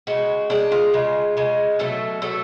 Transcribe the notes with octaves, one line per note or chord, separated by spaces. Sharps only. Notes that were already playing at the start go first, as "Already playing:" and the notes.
C#3 G#3 F#4
C#3 G#3 D4
F4
C#3 G#3
C#3 G#3
B2 F#3 A3 A4
B2 F#3 A3 A4